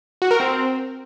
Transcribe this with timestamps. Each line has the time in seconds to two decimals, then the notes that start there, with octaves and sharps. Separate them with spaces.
0.22 F#4
0.31 A#4
0.40 C4